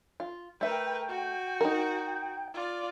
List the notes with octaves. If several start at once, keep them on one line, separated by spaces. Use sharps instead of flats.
F4
A3 A#4 B4 E5 G5
F#4
D#4 A#4
F4 D5